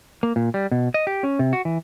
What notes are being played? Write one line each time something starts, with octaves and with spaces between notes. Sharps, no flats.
A#3
A#2
G3
B2
D#5
G4
C#4
C3
F#4
E3